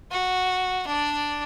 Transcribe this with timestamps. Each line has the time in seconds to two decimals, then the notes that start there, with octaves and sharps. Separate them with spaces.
0.11 F#4
0.87 D4 D5